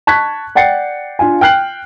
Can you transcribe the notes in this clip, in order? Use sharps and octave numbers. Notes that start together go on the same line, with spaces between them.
A5 C#6 F#6 G#6 B6
D5 F#5 G5 A6 C7 C#7
D4 F4 F5 G#5
G5 F6 F#6 C7 F#7